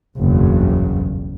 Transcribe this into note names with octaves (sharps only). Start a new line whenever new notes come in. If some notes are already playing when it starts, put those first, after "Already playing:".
F#1 B1 E2 G2 C#3 F#3